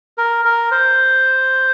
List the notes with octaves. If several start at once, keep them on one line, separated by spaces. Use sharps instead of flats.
A#4
A#4
C5